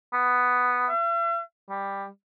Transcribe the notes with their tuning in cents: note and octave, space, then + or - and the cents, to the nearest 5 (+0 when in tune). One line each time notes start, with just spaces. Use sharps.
B3 +5
E5 +45
G3 +10